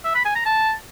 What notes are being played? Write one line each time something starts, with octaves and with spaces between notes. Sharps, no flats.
E5
B5
G#5
A#5
A5